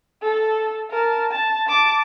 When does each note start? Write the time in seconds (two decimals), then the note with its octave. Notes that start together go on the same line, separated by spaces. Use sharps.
0.22 A4
0.90 A#4 A5
1.31 A5
1.67 A5 D6